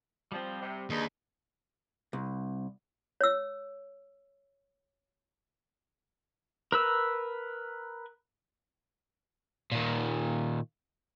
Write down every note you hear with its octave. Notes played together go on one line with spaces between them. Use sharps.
F3 G3 C4
C3
D#2 D4 D#4 G#4 B4
C2
C#5 E6
A#4 B4 E6
A#2 D#3